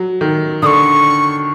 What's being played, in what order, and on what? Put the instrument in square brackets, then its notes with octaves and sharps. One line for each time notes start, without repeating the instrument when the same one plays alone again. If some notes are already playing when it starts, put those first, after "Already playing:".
Already playing: [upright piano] F#3
D#3
[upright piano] D3 [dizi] D#6
[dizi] C#6